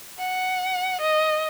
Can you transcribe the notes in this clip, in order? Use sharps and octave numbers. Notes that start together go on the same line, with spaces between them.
F#5
D#5